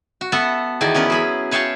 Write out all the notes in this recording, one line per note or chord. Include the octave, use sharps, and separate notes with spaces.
F#4
B3 A4 B4 E5 F#5
E2 D#3 E4 D5
B3 C#4 A#4 B4
F#3 G#4 B5
B4 C#5 E5 F5 G5 A5